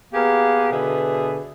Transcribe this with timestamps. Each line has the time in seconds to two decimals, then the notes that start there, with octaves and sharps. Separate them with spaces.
0.12 A#3 B3 G4 G#4 A#4
0.71 B2 D3 G#4 B4 E5